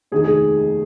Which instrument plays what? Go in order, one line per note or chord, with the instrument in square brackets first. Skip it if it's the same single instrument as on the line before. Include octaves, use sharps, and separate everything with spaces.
[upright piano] F1 D#2 D#3 [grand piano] G#4
[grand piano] G#4